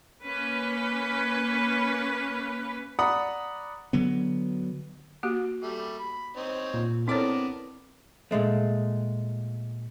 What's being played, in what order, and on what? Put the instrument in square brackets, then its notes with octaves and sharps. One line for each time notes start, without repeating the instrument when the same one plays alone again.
[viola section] A#3 C#4 B4
[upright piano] D5 F#5 A#5 B5 D#6
[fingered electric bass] D3 F#3 B3
[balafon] A#3 F#4 G4
[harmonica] G3 A3
B5
C4 D#4 C#5
[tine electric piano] A#2
[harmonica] B3 D4 A#4 [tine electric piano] C4 D6 [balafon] E4 A4 C#5
[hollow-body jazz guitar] A#2 E3 G#3 A3